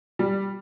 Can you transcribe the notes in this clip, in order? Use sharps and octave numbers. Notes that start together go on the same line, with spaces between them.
G3